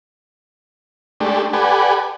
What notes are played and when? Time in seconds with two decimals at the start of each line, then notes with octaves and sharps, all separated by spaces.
1.20 G#3 A3 D4 G4
1.53 G4 A4 B4 D5 F#5 G#5